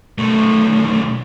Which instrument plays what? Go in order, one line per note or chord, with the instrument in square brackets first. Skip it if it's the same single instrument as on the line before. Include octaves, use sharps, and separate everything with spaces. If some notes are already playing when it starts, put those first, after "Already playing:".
[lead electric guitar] B1 A3